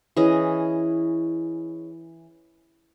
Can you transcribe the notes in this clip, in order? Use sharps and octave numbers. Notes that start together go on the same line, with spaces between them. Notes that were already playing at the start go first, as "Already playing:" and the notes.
E3 C#4 G#4 D#5